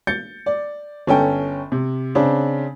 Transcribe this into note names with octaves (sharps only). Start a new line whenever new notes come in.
G6 A6 C#7
D5
G1 C#4 A4 G5
C3
C#3 C4 D4